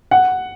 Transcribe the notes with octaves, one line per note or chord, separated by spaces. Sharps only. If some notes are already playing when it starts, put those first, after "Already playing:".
F#5